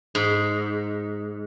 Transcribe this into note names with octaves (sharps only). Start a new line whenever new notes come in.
G#2